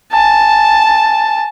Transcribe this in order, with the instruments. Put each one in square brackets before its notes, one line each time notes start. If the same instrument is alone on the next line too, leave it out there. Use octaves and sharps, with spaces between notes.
[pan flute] G#5 [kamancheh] A5